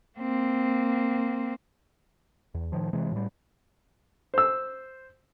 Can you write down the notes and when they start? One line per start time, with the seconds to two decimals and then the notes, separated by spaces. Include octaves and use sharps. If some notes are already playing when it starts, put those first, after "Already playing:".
0.19 A#3 C4
2.55 E2
2.72 A2 D#3 F3
2.93 C3 E3 G#3
3.12 A2 G3
4.34 C5 E6